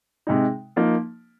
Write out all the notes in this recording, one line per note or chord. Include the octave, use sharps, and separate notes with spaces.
C3 G#3 D#4
F3 A#3 D#4